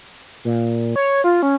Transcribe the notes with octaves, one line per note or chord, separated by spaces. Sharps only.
A#2
C#5
F4
C#4